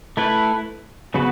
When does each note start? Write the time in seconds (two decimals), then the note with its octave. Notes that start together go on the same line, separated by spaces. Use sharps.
0.17 A3 E4 B4
1.14 C#3 F#3 B3 F#4 B4